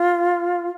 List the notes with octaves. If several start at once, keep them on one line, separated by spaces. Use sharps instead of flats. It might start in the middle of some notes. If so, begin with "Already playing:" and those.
Already playing: F4